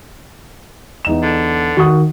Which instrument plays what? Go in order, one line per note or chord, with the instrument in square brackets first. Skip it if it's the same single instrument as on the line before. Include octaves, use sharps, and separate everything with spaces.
[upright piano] E2 D#4 E7
[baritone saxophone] D3
[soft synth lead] D#3 [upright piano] F#4 C#6 D#6